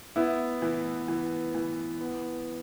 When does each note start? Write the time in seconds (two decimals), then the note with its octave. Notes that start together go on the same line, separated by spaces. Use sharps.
0.16 B3 E4
0.62 E3
1.08 E3
1.55 E3
2.01 B3